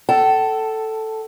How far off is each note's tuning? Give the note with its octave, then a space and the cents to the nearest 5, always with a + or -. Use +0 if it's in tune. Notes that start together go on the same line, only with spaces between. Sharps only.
A4 +0 G5 -45